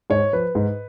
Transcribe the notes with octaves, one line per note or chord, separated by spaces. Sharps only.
G#2 C#5
F3 B4
G#2